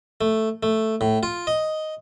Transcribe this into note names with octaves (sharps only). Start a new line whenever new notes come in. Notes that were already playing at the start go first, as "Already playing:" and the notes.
A3
A3
A2
F4
D#5